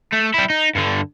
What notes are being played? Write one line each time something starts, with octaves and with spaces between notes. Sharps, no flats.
A3
G3 E4
D#4
G2 D3